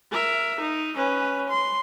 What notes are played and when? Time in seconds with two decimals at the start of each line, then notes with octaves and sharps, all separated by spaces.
0.11 A#4 E5
0.60 D#4
0.96 C#4 B4
1.49 C6